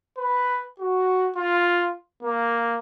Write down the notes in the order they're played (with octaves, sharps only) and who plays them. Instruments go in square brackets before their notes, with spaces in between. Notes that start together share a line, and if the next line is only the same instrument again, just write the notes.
[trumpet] B4
F#4
F4
A#3